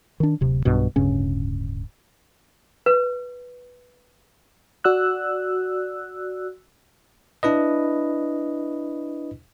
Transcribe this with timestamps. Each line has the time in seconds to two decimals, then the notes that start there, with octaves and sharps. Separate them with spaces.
0.20 D#3 D4
0.41 D1 C3
0.65 B1 G2 B2
0.96 D1 G2 C#3 C#4
2.86 B4
4.84 F#4 D5 E6 F#6
7.43 D4 E4 B4 D#5